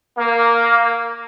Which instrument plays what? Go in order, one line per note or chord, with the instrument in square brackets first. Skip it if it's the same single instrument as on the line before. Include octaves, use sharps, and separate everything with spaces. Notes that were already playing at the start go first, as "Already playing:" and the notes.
[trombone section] A#3